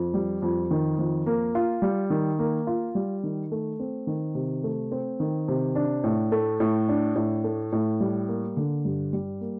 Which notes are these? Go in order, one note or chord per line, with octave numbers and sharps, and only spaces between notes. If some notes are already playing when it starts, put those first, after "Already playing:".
Already playing: F2
G3
F2
D#3
F2
A#3
F4
G3
D#3
A#3
F4
G3
D#3
A3
C4
D#3
C3
A3
C4
D#3
C3
D4
A2
A3
A2
D4
A2
A3
A2
G3
A#3
D3
G2
G3
A#3